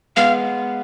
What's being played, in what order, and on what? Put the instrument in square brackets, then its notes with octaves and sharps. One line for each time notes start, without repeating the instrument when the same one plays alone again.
[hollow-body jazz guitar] G#3 B3 [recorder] F5